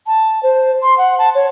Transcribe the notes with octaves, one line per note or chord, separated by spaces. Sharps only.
A5
C5
C6
F#5
A5
C#5